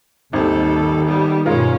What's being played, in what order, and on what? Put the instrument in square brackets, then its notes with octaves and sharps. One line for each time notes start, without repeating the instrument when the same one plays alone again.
[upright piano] G#1 [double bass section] D#2 [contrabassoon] D#3 [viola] G3 A4
[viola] G3 B3
[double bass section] G2 B2 [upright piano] G#3 F4 A#4 [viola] C#4